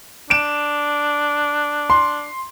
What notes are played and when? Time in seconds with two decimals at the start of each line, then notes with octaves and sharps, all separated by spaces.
0.30 D4 D7 E7
1.90 C6